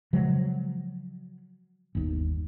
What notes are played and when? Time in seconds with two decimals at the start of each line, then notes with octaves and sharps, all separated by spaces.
0.13 C#3 F3 F#3 G#3
1.95 G1 D#2